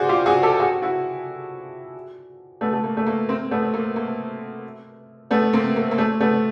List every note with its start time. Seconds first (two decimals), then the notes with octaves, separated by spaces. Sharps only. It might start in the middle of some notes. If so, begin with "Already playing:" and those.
Already playing: F#4 G#4 C5 D5
0.09 F4 G4
0.26 F#4 G#4
0.43 G4 A4
0.60 F#4 G#4
0.82 E4 F#4
2.61 A3 B3
2.73 A3
2.84 A#3
2.97 A3
3.07 A#3
3.29 A#3 C4
3.51 A3 B3
3.74 A#3
3.96 A#3
5.31 A3 B3
5.53 A#3 C4
5.76 A#3
5.91 A#3
5.98 A3
6.21 A3 B3